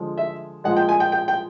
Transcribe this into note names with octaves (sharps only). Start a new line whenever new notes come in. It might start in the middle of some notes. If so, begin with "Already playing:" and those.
Already playing: D3 F3 G#3
E5
A#2 F3 G#3 F#5
G5
G#5
G5
G5
G5